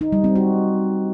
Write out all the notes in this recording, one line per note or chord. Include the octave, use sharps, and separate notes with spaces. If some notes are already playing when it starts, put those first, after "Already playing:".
D#4
G3
C4
F#4